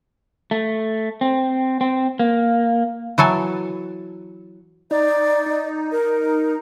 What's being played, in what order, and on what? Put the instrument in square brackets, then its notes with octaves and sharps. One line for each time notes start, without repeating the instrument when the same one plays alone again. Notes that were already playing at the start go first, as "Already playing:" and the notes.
[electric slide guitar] A3
C4
C4
A#3
[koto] E3 F#3 A4 G#5
[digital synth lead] D#4 [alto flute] D5
[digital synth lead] D#4
[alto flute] A#4